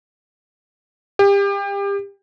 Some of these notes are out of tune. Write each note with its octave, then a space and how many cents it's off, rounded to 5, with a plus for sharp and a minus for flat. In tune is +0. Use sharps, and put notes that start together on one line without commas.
G4 +30